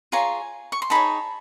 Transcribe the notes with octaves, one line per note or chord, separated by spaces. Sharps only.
F4 G#4 C#5 G#5 A#5
C#6
C6
D#4 G#4 C#5 A5 B5